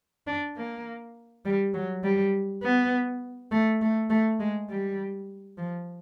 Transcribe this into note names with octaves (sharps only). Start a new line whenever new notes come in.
D4
A#3
G3
F#3
G3
B3
A3
A3
A3
G#3
G3
F3